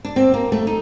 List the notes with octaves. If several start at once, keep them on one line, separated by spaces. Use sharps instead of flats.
D4
C4
A#3
A3
D#4